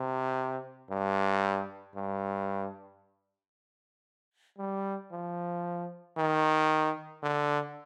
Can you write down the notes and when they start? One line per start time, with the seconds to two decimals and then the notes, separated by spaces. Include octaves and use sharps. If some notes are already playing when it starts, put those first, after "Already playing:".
Already playing: C3
0.90 G2
1.95 G2
4.58 G3
5.12 F3
6.17 D#3
7.23 D3